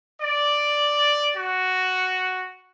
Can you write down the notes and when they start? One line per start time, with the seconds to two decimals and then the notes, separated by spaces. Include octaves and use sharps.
0.21 D5
1.37 F#4